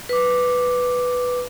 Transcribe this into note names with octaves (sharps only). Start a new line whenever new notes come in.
B4 D6